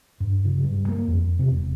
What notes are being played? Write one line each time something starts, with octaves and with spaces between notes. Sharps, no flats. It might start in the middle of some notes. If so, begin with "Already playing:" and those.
G2
C#3
G2
A#3
F2
C3
E1